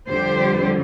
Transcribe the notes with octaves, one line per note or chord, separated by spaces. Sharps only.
F2 D3 G3 G4 C5